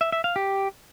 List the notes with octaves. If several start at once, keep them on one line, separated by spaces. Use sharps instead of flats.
E5
E5
F5
G4